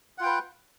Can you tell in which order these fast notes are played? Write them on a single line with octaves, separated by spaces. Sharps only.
F#5 F4 G5 B4